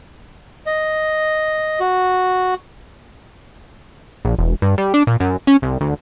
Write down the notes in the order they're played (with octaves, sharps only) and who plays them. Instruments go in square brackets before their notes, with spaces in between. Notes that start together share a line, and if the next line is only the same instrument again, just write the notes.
[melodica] D#5
F#4
[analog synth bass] A#1
E1
G2
G3
D4
A#2
F#2
C#4
C2
D2